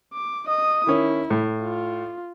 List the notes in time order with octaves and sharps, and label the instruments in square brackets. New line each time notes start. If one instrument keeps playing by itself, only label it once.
[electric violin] D6
D#5 D#6
[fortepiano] D#3 C#4 [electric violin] E4
[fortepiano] A2
[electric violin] F4